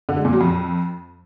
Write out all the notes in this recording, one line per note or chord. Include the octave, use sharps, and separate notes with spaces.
D3
G#3
A#2
F#3
F2